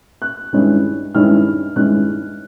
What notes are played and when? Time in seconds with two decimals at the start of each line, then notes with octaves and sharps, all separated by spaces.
0.22 F#6
0.53 G2 D#3 G#3 C#4 E4
1.14 G2 D#3 G#3 C#4 E4 F6
1.76 G2 D#3 G#3 C#4 E4 F#6